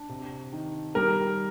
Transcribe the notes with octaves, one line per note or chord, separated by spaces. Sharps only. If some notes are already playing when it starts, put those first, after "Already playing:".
Already playing: D4
C3
D#3
G3 A#4